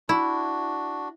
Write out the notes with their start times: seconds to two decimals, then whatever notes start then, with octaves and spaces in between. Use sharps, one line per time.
0.09 D4 E4 F#4